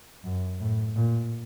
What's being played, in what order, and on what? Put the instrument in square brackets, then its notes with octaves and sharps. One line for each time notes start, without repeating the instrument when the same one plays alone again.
[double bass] F#2
A2
A#2